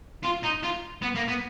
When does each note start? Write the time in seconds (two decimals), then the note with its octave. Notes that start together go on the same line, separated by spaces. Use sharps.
0.24 F4
0.44 D#4
0.63 F4
1.02 B3
1.15 A#3
1.28 B3